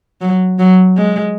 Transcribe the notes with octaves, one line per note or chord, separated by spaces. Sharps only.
F#3
F#3
G#3